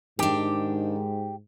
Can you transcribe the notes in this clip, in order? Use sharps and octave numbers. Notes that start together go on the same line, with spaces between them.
G#2 D#3 D4 G4 G5